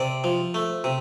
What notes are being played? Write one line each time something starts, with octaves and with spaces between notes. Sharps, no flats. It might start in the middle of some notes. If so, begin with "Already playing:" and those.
Already playing: C3 D5
F3
A3
C3